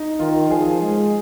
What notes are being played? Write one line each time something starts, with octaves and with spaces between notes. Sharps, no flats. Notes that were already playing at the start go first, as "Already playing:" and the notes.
Already playing: D#4
D#3 F4
F3 G#4
G#3